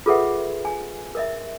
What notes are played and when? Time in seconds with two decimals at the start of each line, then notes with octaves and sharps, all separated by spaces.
0.06 F4 G#4 A4 B4 E5 F#5
0.65 G#5
1.15 A#4 D#5 E5